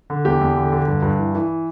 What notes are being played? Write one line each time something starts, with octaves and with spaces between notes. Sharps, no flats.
D3
E2 G4
E2
D3
D3
G2
G2
E3
E3